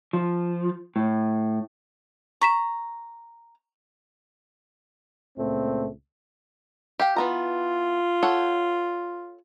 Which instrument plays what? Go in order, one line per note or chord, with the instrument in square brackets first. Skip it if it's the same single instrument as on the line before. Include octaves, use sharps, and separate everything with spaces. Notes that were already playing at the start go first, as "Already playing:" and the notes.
[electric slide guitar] F3
A2
[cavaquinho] A#5 [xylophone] C#6 B6 E7
[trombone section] C#2 A#2 A3 C4
[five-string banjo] G4 F5 G5
[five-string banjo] E3 B3 A#5 [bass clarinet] F4
[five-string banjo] A4 C#5 F#5